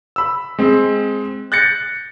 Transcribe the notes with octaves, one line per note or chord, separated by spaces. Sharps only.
B5 E6
G#3 C4
F#6 G6 A6 A#6 C#7